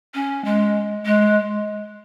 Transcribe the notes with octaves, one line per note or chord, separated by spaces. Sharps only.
C#4
G#3
G#3